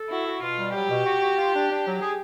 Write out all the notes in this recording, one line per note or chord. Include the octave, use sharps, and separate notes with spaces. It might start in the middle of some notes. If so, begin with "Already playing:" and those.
Already playing: A4
E4 F#4
F#4
B2 F4
G3
F#3 G4
B2
F#4
F#4
F4
D4
D4
F#3
G#4